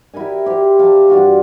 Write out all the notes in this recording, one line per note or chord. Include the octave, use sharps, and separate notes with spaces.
E4 G4 A#4 G#5
G4 C5
F5 A5
G2 F4 F#4